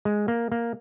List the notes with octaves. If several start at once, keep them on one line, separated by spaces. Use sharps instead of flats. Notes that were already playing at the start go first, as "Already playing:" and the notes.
G#3
A#3
A#3